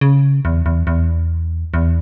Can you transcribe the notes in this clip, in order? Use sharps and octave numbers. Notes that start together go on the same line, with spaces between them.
C#3
E2
E2
E2
E2